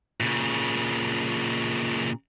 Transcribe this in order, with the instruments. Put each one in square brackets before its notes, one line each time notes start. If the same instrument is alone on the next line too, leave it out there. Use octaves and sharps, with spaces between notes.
[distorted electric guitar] A#2 C#3